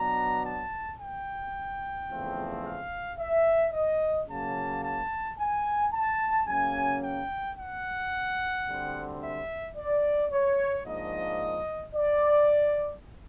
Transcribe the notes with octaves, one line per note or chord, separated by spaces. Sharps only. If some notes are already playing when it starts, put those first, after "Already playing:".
Already playing: B2 F#3 B3 D4 A#5
A5
G5
E2 C#3 F3 A3 C4
F5
E5
D#5
C#3 F#3 A#3 A5
A5
G#5
A5
C#3 F#3 A#3 C#4 G#5
G5
F#5
D2 D3 G3 C4
E5
D5
C#5
G#2 F3 A#3 D4 D#5
D5